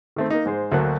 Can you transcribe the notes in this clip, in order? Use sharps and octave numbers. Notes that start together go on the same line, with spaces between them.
D#3 A3 C4
A#3 D#4
G#2 G#3 C5
D2 F#3 A3 A#3 C5 F#5